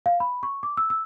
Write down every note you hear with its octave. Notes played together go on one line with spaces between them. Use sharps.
F5
B5
C#6
D6
E6
E6